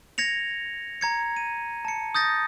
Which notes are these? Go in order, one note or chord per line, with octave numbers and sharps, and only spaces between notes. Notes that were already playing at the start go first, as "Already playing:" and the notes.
G#6 A#6 C#7 F7
A#5 G#6 C#7
D#7
A5 C#7
D#6 G6 A6 A#6